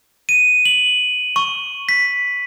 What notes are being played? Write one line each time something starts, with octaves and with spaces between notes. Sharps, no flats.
D#7
F#7
C#6
B6